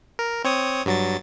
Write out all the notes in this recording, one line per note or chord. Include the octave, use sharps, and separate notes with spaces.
A#4
C4 C#5 D#6
G2 F#3 A6